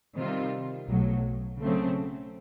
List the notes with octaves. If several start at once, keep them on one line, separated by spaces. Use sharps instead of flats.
C3 D#3 G3 C4 F4
B1 A2 F#3
C#3 F#3 A3 C4